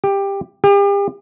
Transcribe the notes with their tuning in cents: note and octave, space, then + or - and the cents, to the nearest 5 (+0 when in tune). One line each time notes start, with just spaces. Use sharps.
G4 +15
G4 +40